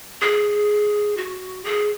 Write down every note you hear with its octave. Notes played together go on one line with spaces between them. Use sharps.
G#4
F#4
G#4